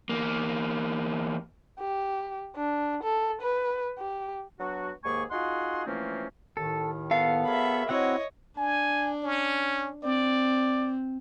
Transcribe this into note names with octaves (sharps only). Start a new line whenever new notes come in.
E2 A#3
G4
D4
A4
B4
G4
F#3 B3 D4 F#4
D#2 G#2 A#3 G#4 G#5 C#6
D#4 F4 F#4 G#4 F#5 C6
E3 F3 A3 A#3 C4 C#4
D#2 A2 D#3 A4
B3 A4 F5
F#3 G#4 A#4 E5 B5
C4 E4 F#4 C#5 D#5 F#5
D4 G#5
C#4
C4 D5